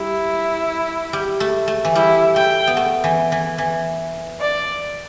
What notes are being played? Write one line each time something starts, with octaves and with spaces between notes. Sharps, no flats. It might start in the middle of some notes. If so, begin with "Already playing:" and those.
Already playing: G3 E4
G3
A3
A3
E3
G3 E4
A3 G5
B3
A3
E3
E3
E3
D5